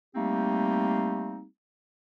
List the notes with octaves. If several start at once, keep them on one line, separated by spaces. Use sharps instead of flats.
G3 A3 A#3 C4 D#4 G4